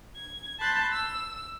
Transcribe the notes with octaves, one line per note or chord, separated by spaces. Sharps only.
G#6
A5 B5 C6 F#6 G6 A6
E6